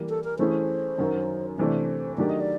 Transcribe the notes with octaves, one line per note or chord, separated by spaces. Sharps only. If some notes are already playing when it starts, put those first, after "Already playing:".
Already playing: E3 G3 A#3
A4
A#4
E3 A3 C#4 E4 G#4 C5
F#2 D#3 F#3
C3 E3 A3 D4 C5
D#3 F#3 A3 D4 G4 D5
D#5
D5